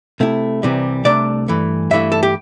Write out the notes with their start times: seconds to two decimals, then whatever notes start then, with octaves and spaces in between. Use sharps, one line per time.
0.20 C3 A3 E4
0.63 C2 C3 E3 G3
1.05 C2 C3 A3 D4 D5
1.48 G2 E3 A3
1.91 G2 E3 A3 E4 E5
2.12 A4
2.23 G4